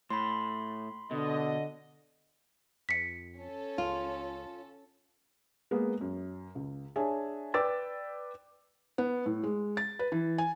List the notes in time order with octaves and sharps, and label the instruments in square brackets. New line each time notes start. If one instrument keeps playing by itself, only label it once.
[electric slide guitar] A2 [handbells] B5 C6
[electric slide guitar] B2 [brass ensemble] D3 D#5
[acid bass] F2 [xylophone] B6 C#7
[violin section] C#4 A4
[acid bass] C#2 [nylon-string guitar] F4
[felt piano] G#3 A#3 B3
F#2
C#2
D4 G#4 C#5 E5 G#5 A5
B4 D5 G5 D6 E6 A6
B3
A2
G#3
A6
B4
E3
G#5